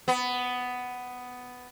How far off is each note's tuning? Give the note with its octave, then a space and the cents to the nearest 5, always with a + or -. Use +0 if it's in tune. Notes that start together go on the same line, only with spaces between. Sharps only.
B3 +10